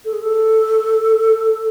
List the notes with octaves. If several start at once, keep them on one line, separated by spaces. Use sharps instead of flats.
A4
G#4
A4